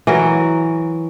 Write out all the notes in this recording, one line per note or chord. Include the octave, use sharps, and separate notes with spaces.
E3 F#3 A#4